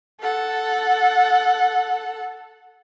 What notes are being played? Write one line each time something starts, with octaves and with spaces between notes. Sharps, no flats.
A4 F#5